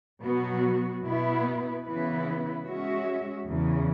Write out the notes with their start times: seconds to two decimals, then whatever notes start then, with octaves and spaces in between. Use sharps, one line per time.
0.23 B2 F#3 B3 F#4
1.04 B2 B3 E4 B4
1.85 C#3 E3 B3 E4 B4
2.66 G#3 C#4 F#4 E5
3.46 E2 C#3 E3